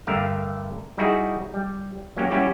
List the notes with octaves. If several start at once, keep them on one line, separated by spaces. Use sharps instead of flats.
G2 D3 A3 A#4 F5
G3 D#4 E4 F#4 G#4
G3
F#3 A#3 C#4 G4
G3 C#4 E4 F#4 G4